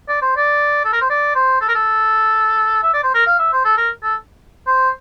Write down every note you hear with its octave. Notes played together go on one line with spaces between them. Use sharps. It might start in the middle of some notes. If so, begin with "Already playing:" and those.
D5
C5
D5
A4
A#4
C5
D5
C5
A4
A#4
A4
E5
D5
C5
A#4
F5
E5
C5
A4
A#4
A4
C5